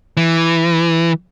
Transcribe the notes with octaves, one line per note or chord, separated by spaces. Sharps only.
E3